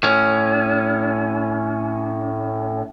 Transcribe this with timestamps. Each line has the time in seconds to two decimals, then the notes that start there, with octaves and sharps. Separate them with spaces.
0.03 A2 C#4